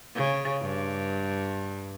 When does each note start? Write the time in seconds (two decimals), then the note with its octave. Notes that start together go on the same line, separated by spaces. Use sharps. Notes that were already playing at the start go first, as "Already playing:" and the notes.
0.15 C#3
0.62 G2